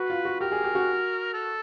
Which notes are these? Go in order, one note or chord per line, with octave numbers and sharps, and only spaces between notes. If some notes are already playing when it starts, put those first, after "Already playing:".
Already playing: F#4 B4
F4
F#4
G4 A#4
G#4
G4
F#4
A4